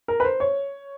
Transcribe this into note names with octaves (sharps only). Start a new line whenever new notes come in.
A#4
B4
C5
C#5